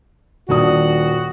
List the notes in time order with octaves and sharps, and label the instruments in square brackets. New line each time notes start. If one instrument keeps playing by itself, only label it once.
[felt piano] D#1 D4 D#6 [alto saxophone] F#4